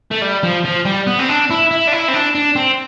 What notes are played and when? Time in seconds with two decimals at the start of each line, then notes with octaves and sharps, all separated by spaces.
0.11 A3
0.22 G3
0.43 F3
0.65 F3
0.85 G3
1.07 B3
1.19 C4
1.29 D4
1.50 E4
1.71 E4
1.87 D4
1.92 E4
2.08 C4
2.13 D4
2.35 D4
2.56 C4